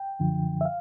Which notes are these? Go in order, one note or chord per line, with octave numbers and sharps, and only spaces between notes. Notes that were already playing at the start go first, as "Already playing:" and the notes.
Already playing: G5
F#2 D3 F3
E5
F5